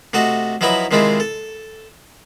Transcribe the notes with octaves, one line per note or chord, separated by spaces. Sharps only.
C3 A3 F#4 D#5
F3 F#3 D#4 E4 B4 E5
C3 D#3 G#3 C4 E4 F4
A4